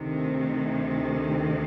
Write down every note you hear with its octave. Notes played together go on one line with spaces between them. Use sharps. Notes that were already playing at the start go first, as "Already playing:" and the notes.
Already playing: D2 C3 D#3